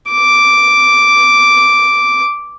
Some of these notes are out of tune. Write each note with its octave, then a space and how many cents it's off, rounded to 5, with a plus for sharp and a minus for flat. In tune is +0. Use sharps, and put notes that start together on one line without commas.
D6 -5